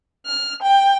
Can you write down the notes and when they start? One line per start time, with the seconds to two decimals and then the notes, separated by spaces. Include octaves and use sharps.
0.24 F6
0.61 G5